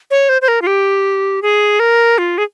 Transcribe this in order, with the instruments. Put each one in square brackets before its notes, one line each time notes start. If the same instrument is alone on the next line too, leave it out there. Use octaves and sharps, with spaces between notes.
[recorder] C#5
C5
C5
A#4
F4
G4
G#4
A#4
F4
G#4